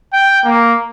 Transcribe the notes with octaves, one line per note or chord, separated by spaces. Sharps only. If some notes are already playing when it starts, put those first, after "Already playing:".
G5
A#3